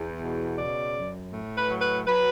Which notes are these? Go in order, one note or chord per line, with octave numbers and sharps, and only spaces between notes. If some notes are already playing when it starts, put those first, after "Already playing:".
Already playing: E2
B2
C#3 D5
F#2
A2
B4
F#3
B4
F#3 B4